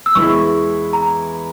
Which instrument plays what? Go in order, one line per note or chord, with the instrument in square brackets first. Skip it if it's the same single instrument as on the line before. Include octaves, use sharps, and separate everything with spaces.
[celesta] E6
[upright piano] E2 E3 G#3 E4 [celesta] C#6
[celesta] A#5